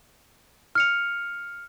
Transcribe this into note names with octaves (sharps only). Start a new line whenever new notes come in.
F6 C#7 F7